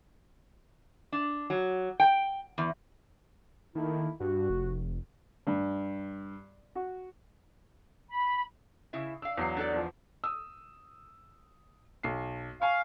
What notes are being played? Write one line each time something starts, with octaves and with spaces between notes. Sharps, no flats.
D4
F#3
G5
E2
D#3 A3 A#3 E4
G2 F#4
F1
G2
F#4
B5
C#3 E4 E5
D4 F5 E6
E2 F#3 C7
D4 A4 D5
E2 F3
D#6 E6
B1 C7
F5 G#5 C#6